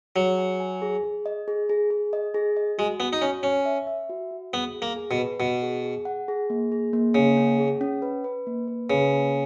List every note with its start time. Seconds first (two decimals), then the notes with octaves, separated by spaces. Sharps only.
0.16 F#3 G#4
0.38 G#5
0.60 G#5
0.82 G#4
1.04 G#4
1.26 D#5
1.48 G#4
1.69 G#4
1.90 G#4
2.13 D#5
2.34 G#4
2.57 D#5
2.78 G#3 F#4
3.00 B3 F#4
3.13 D#4
3.22 C#4 C#5
3.43 C#4 C#5
3.65 E5
3.87 E5
4.09 F#4
4.31 F#4
4.53 B3 G#4
4.74 G#4
4.82 A#3
4.96 G#4
5.11 B2
5.18 B4
5.40 B2 F#5
5.62 G#4
5.84 G#4
6.05 F#5
6.28 G#4
6.50 A#3
6.72 G#4
6.93 A#3
7.15 C#3 A#3
7.37 C#4
7.59 G#4
7.81 C#4
8.02 B4
8.24 B4
8.47 A#3
8.68 B4
8.89 C#3 B4
9.12 A#3